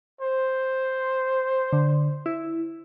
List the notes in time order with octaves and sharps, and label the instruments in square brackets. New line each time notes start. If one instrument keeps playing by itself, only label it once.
[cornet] C5
[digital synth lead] D3
E4